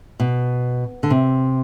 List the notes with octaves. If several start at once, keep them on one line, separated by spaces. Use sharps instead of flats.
B2
D3
C3